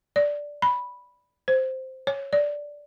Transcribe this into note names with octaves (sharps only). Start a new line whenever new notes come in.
D5
B5
C5
C#5
D5